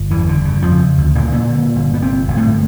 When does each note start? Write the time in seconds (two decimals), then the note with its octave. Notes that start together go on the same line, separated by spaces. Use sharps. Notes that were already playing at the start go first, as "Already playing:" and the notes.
Already playing: G1
0.10 E2 E3
0.19 G2
0.28 D3
0.45 C#3
0.62 F2 F3
0.71 C#3
0.98 D2
1.15 A#2 A#3
1.24 C#3
1.32 A#2 A#3
1.49 D3
1.76 G1
1.94 B3
2.02 G1 C3 C4
2.28 G1
2.37 A2 A3